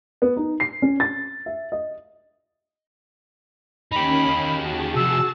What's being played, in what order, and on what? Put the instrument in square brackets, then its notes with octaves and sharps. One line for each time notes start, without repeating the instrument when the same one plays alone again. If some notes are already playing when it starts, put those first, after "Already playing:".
[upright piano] B3
D#4
C7
C#4
A6
E5
D#5
[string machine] D#3 C#4 [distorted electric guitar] D#4 G4 [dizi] B5
[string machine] F#4 G#4 A5
[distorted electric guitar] C3 F3 [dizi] E6